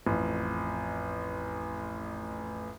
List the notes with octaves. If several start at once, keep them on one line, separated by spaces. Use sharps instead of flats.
A1 F2